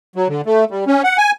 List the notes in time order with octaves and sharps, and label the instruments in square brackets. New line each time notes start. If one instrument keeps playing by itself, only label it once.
[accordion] F#3
D3
A3
G3
C#4
F#5
G#5